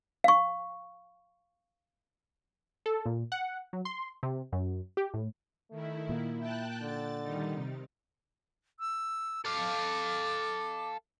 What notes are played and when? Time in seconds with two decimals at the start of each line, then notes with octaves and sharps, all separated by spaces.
0.24 F5 C#6
2.86 A4
3.06 A#2
3.32 F#5
3.73 F#3
3.85 C6
4.23 C3
4.52 F#2
4.97 G4
5.14 A2
5.71 D#3 A3 E4
6.09 A#2 A#3
6.39 E4 G5 A5 F#6
6.82 D3 A6
7.22 D#3 G3 D#4
7.53 C3
8.80 E6
9.45 A4 F5 D6